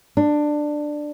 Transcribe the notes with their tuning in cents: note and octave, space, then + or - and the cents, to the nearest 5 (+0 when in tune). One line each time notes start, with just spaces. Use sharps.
D4 +15